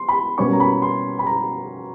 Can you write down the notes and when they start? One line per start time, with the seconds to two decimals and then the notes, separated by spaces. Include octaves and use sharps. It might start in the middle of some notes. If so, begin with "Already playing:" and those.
Already playing: C6
0.09 B5
0.38 B2 G3 A#3 C#4 C#6
0.53 A#5
0.60 B5
0.82 C6
1.19 B5
1.27 A#5